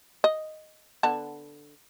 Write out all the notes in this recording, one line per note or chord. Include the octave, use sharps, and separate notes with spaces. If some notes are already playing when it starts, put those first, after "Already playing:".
D#5
D3 B3 A5